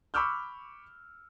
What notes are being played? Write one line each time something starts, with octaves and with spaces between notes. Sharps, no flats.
B5 C#6 D6 E6 F6 G6